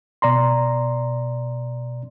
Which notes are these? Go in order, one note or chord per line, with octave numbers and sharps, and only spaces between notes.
B2 D5 A#5 C6